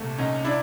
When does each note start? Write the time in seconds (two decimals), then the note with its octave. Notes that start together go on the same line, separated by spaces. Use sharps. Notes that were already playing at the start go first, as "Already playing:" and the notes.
Already playing: C2 A#2 A3
0.18 C2 C#4 D#4
0.44 D4 E4